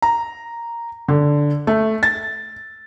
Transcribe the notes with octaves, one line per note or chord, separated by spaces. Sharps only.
A#5
D3
A3
A6